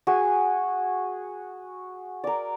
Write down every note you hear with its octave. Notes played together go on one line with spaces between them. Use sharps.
F#4 G#4 G#5
A#4 D5